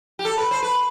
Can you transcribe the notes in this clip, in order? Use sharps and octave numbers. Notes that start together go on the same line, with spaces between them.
G4
A4
B4
C5
B4